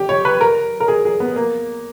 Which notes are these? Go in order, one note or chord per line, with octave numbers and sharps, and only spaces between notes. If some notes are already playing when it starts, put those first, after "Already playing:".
Already playing: G4
C#5
B4
A#4
A#4
G#4
G#4
B3
A#3